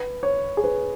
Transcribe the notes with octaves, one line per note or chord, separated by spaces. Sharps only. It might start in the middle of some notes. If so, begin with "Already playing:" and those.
Already playing: B4
C#5
G#4
B4